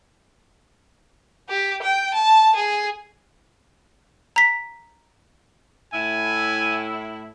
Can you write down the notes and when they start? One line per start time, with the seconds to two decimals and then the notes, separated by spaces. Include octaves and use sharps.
1.49 G4
1.83 G5
2.14 A5
2.55 G#4
4.36 A#5 B6
5.93 A2 E4 G#5